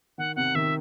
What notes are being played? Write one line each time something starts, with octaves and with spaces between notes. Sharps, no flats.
D#3 F#5
C3 F#5
D#3 E5